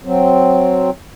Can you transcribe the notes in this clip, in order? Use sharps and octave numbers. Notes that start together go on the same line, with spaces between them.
F#3 C4